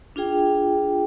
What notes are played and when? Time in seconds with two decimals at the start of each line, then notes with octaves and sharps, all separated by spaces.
0.16 D4 F4 G#4 G5